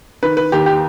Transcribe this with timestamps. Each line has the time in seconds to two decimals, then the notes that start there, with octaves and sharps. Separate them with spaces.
0.23 D#3 B4
0.37 B4
0.52 D#2 G4
0.66 G4